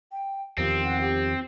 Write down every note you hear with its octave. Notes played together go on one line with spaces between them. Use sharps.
G5
E2 D#3 F3 C4 G4
F#5
G4